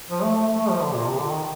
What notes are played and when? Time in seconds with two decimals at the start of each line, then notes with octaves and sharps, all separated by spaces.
0.11 F3
0.22 A3
0.35 A3
0.47 A3
0.58 A3
0.70 F3
0.82 D3
0.94 A#2
1.06 C3
1.18 D3
1.30 D#3